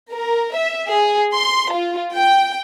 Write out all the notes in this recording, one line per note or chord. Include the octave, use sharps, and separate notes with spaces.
A#4
E5
G#4
C6
F4
G5